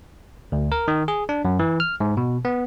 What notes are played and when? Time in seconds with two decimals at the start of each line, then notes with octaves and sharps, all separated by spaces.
0.52 D2
0.72 A#4
0.88 D#3
1.08 G#4
1.29 D4
1.45 F#2
1.59 E3
1.80 F6
2.00 G#2
2.17 B2
2.45 B3